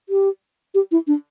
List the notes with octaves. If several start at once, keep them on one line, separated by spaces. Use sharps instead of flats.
G4
G4
E4
D4